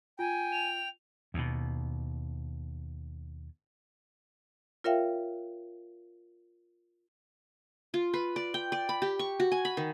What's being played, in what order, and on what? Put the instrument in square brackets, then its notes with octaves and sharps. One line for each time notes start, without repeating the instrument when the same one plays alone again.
[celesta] F4 [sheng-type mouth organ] G5 [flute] G#5
[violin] F7
[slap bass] D#2 B2
[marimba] F4 A#4 C#5 E5 F5 G5
[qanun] F4
B4
D5
G5
D5
B5
G4
C#6
F#4
G#5
B5
D#3